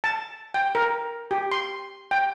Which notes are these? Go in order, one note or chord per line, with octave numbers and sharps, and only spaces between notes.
A5
G5
A#4
G4
C6
G5